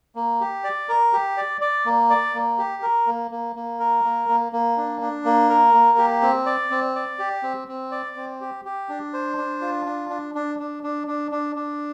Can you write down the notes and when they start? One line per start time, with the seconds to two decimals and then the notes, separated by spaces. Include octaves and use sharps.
0.15 A#3
0.41 G4
0.64 D5
0.89 A#4
1.13 G4
1.37 D5
1.61 D5
1.86 A#3
2.10 D5
2.34 A#3
2.58 G4
2.83 A#4
3.07 A#3
3.31 A#3
3.56 A#3
3.80 A#4
4.04 A#3
4.29 A#3
4.52 A#3
4.77 D4
5.01 D4
5.25 A#3
5.49 A#4
5.74 A#3
5.98 G4
6.22 C4
6.46 D5
6.70 C4
6.95 D5
7.19 G4
7.43 C4
7.68 C4
7.92 D5
8.16 C4
8.41 G4
8.65 G4
8.89 D4
9.13 C5
9.37 D4
9.61 F4
9.85 D4
10.10 D4
10.35 D4
10.59 D4
10.83 D4
11.07 D4
11.31 D4
11.56 D4